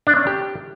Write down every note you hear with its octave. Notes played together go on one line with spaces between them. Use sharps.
D4
C#4
G4